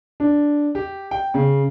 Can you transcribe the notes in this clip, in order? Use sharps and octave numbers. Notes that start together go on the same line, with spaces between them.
D4
G4
G5
C#3